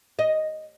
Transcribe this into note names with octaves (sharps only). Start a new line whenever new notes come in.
D#5